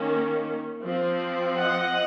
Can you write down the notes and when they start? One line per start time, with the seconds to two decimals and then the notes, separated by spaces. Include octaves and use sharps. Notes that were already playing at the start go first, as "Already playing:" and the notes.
Already playing: D#3 A#3 C#4
0.83 F3 C4
1.59 D#5 F#5